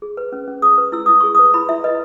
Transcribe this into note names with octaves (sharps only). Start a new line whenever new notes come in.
G#4
B4
C#4
C#4
G#4 D#6
B4
E4 E6
E4 D#6
G#4 C#6
B4 D#6
E4 B5
E4 E5
B4 D#5